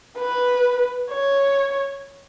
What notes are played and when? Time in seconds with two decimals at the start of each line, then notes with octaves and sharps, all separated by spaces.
0.18 B4
1.10 C#5